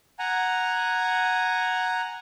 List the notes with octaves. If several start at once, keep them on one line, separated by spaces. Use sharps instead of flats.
F#5 G#5 A#5